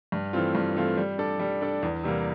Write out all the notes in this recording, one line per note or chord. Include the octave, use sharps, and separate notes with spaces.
G2
E3 A3 C4 F4
G2
E3 A3 C4 F4
G3
D4 A4 D5
G3
D4 A4 D5
E2
C3 E3 G3 A#3